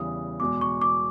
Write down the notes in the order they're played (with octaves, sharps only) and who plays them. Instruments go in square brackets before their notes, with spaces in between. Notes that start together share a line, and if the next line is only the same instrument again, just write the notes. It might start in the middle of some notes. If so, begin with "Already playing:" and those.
Already playing: [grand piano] E2 C#3 E3 G3 [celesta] D#6
[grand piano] E2 B2 G#3 [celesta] D6
[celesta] C#6
D6